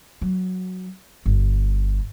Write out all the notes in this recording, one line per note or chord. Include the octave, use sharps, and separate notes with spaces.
F#3
G1